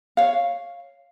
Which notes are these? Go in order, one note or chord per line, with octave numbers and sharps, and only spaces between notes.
C#5 F5